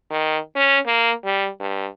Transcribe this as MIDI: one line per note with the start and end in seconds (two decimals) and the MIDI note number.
0.10 0.38 51
0.56 0.78 61
0.86 1.12 58
1.25 1.48 55
1.60 1.87 43